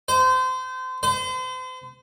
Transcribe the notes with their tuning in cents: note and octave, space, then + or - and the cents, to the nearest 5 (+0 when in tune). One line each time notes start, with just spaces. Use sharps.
C5 -30
C5 -40